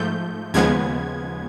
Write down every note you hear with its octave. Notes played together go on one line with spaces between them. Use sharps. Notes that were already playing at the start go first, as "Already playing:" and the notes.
Already playing: G#2 F3 A3 G6
D#2 C#3 F3 G#3 B3 G#6